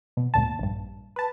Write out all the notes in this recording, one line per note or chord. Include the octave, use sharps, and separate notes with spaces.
B2
G#1 D2 A#2 A5
A#1 G2
B4 A5